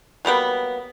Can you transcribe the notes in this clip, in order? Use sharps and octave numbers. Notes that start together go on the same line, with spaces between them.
F#3 G3 A#3 B3